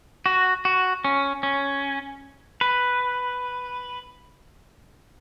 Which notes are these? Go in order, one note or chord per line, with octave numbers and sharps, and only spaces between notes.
F#4
F#4
C#4
C#4
B4